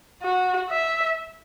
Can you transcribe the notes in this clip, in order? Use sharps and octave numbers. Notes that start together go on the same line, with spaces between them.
F#4
E5